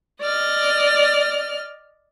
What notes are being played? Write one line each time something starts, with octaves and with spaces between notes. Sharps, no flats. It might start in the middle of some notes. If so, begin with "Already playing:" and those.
D5 D#5 F6